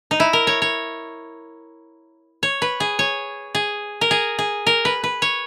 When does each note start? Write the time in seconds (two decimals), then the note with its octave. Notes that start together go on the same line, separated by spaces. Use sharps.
0.11 D#4
0.20 E4
0.33 A#4
0.47 C#5
0.62 C#5
2.43 C#5
2.62 B4
2.80 G#4
2.99 C#5
3.55 G#4
4.01 A#4
4.11 G#4
4.39 G#4
4.67 A#4
4.85 B4
5.04 B4
5.22 C#5